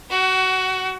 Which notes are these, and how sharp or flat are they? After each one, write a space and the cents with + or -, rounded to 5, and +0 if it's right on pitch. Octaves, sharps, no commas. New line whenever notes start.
F#4 +20 F#5 +35